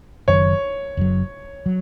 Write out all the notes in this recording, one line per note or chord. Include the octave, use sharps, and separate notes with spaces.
F#1 F#2 D#3 F#3 C#5
F#1 F#2 F#3
F#3